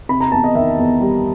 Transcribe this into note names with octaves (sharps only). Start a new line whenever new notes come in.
C3 B5
A#5
E2 A5
D#5
D#3 E5
E2
G3